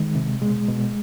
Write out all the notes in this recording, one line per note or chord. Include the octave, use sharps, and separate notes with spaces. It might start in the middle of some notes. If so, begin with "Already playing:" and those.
Already playing: D#3 G#3
C3
B2 G#3
B2